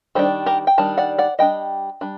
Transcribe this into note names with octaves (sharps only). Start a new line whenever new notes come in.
D#3 G3 D4 A4 C5
G4 A#4
G5
D#3 G3 D4 A5
D5 F#5
D5 F#5
G3 D4 D#5 G5
G3 D4